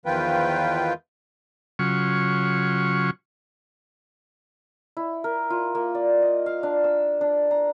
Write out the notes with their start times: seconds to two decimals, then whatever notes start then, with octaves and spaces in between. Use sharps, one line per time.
0.06 E2 D#3 F3 F4 B4 G5
1.79 C#3 F#3 F4 C#6
4.97 E4
5.24 A#4
5.50 F4
5.75 A#3
5.95 D5
6.22 D#5
6.46 F5
6.63 D4
6.84 E6
7.21 D4
7.51 A#5